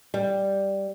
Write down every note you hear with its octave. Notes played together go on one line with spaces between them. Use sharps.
G3